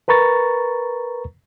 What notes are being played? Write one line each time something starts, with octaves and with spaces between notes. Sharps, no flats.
A#4 B4 A#5 C#6 A6